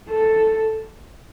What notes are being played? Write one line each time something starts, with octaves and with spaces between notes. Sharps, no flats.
A4